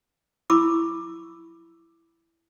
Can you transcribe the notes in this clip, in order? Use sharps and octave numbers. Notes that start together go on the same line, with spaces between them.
E4 B5 C#6 D6 E6